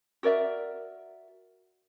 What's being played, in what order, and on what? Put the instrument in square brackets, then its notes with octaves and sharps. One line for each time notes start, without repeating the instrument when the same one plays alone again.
[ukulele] F#4 A#4 D5 E5